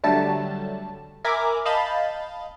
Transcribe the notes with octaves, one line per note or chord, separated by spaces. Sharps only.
D3 F#3 G3 A3 A5
A#4 E5 G#5 A#5 B5 D6
D#5 F5 A5 B5 G6 A6